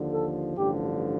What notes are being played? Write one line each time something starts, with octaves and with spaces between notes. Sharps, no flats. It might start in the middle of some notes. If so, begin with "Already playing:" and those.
Already playing: D#2 D3 F3
A4
A1 G2 D3 F3 G4